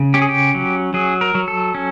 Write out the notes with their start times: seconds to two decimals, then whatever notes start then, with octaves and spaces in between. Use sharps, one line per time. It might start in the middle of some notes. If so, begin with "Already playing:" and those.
Already playing: C#3
0.14 C#4 G4
0.22 G#4
0.29 G4
0.54 F#3
0.94 F#3 G#4
1.21 A#4
1.35 F#3
1.48 A4
1.75 C#4